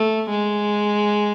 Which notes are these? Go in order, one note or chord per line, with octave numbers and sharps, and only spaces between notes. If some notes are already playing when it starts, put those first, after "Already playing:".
Already playing: A3
G#3